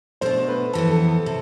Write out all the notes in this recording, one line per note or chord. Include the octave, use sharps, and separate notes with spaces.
B2 A3 D4 C5
B4
F2 E3 B3 A4
A4
A4
C3